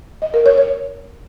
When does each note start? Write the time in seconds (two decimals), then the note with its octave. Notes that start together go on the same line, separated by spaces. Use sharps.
0.22 D#5
0.34 A#4
0.46 C#5
0.58 C#5